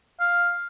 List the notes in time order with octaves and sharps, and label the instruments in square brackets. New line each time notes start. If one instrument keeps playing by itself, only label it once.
[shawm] F5